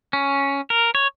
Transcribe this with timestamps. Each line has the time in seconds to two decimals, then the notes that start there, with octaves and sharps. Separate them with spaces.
0.13 C#4
0.70 A#4
0.95 C#5